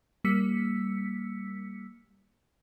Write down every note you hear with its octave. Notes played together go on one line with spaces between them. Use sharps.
G3 A#3 E6 B6 C#7